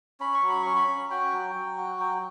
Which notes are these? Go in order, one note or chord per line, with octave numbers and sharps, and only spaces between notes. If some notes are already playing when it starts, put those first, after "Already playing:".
C#4 B5
C#6
F#3
B5
C#4 C#6
B5
C#4
F#4 G5
F#3
F#3
F#4
F#3 G5